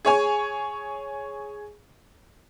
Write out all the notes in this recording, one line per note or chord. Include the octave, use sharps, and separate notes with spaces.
G#4 C#5 G#5 C#6